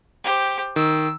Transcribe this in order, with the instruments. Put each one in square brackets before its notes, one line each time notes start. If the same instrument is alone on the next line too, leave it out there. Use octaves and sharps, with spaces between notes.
[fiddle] G4 C5
[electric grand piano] D#3 [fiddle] E6